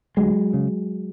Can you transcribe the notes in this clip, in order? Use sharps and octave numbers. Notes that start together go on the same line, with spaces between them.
D2 F#3 G#3
C#3